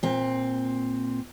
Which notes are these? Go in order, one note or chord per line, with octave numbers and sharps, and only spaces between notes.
A#2 C4